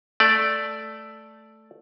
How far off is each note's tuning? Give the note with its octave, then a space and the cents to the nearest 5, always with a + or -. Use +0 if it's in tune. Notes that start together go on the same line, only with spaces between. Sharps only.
A3 +0 D5 +0